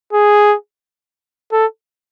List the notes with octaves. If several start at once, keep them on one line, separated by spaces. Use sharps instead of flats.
G#4
A4